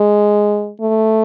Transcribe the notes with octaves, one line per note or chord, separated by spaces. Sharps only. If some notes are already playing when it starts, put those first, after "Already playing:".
Already playing: G#3
A3